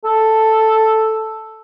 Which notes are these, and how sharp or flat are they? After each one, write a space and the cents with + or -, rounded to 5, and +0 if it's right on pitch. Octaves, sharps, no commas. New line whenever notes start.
A4 +0